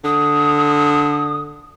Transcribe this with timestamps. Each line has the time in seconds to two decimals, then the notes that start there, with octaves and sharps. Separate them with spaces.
0.04 D3 D#6